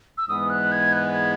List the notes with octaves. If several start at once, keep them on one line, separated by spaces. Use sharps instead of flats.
E6
G#2 E3 G#3 B3 D#6
F#6
G#6
F#6
G#6